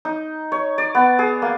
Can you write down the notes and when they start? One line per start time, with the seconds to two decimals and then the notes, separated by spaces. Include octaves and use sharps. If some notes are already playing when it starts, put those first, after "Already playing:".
0.05 D#4
0.52 C#5
0.78 D5
0.95 B3
1.19 G#4
1.42 A#3